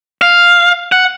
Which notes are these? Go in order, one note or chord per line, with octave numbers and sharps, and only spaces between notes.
F5
F#5